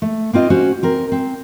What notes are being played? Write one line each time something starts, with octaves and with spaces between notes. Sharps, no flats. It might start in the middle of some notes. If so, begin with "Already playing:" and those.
A3
A#3 C4 F4 D#5
C#4 F#4 C5
C4 A#4
C4